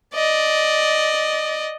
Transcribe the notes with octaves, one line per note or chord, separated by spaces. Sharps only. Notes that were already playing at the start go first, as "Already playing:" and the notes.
D5 D#5